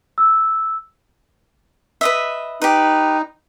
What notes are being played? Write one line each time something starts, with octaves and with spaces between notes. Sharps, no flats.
E6
B4 D#5 E5
D#4 G4 B4